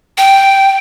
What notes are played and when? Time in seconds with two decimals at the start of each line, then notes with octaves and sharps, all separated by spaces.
0.18 G5